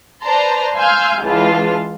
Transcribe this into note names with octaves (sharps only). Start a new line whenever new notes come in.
B4 C5 D5 A5 A#5 C6
F5 G#5 C6 E6 F6 G6
C#2 E3 G#3 F4 B4 A5